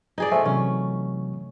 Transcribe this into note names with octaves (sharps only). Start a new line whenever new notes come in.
D#4 G#4 D5
A3 C5 E5 G#5
C3 E3 F#3 C#4